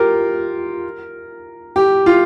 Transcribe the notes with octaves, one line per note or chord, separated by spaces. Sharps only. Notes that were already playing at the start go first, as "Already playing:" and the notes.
Already playing: F4 G4 A#4
G4
F4